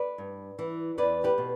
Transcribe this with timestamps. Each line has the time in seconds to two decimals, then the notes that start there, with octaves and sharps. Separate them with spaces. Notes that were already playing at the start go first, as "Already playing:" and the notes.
Already playing: B4 D5
0.18 G2
0.59 E3
0.98 E2 B4 D5
1.24 G4 B4
1.38 B2